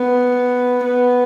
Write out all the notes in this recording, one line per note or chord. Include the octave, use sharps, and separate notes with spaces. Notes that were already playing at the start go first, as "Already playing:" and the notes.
Already playing: B3
B3